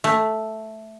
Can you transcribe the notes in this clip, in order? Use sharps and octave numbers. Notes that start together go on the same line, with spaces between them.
A3